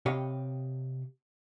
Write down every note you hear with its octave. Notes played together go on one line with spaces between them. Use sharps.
C3 G4 C#5 D#5 F5 B5